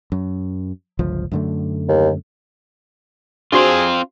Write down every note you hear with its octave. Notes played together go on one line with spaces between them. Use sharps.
F#2
G1 C#2 F3
F#2 D3 A3
D#2
C4 D4 F4 F#4 G#4 C5